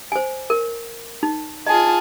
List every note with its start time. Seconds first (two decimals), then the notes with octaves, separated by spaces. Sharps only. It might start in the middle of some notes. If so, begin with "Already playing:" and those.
0.12 C5 G#5
0.50 A#4
1.23 D#4
1.67 F4 G#4 D#5 A5